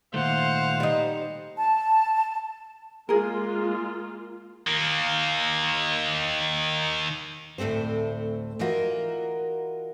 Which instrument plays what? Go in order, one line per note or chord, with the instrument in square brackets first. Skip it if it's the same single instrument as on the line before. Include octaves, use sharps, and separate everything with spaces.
[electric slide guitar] A#2 D#3 A3 [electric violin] C5 [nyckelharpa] F5 F#5
[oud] G3 D#4
[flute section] A5
[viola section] G#3 A#3 F4 [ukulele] G#4 A#4
[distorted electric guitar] D#3 A#3
[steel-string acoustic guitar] D2 A2 A3 C4 C5
E3 D#4 F4 F#4 A#4